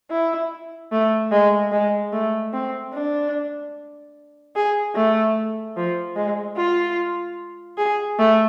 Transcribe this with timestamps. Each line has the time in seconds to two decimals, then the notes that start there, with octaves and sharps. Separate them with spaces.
0.10 E4
0.92 A3
1.32 G#3
1.72 G#3
2.13 A3
2.53 C4
2.93 D4
4.56 G#4
4.95 A3
5.77 F3
6.16 G#3
6.57 F4
7.78 G#4
8.19 A3